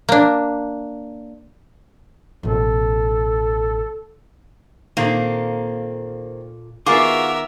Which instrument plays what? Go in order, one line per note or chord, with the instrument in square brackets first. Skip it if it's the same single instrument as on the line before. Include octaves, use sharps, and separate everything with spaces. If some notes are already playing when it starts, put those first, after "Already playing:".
[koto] A#3 D4
[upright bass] A1 B2 [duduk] A4
[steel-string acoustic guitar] A#2 A4 [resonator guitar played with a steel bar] D#3 A#3 C4
[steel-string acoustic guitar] D#3 B3 [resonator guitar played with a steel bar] F4 F#4 G#4 [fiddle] A#4 E5 [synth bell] D6